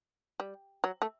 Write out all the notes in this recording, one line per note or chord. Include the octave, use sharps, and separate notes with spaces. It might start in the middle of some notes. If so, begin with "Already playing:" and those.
G3
F#3
A3